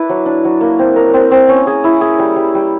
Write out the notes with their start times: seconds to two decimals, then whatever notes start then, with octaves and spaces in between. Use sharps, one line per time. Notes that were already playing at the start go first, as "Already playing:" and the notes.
Already playing: D4 E4 B4
0.09 F#3
0.26 D4
0.44 F#3
0.61 A#3
0.79 C4
0.96 A#4
1.14 C4
1.31 C4
1.49 C#4
1.67 G#4
1.84 E4
2.01 G#4
2.19 G3
2.36 G3
2.55 G3